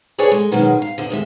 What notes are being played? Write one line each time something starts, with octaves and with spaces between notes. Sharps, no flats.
G#4 A4 B4 C#5 D5 G#5
G#3
B2 D#3 F#3 G#3 C#4
F5
E2 D3
D#2 G#3 E5